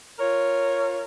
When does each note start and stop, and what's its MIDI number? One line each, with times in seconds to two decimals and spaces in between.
0.19 1.04 65
0.19 1.04 70
0.19 1.04 73